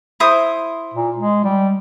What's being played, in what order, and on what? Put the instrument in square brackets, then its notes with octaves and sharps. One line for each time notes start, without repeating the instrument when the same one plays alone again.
[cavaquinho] E4 C5 D#6
[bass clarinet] A#2
G#3
G3